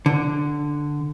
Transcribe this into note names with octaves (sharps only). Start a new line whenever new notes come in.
D3